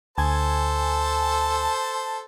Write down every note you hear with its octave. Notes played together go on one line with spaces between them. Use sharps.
D2 A4 C5 G#5 A5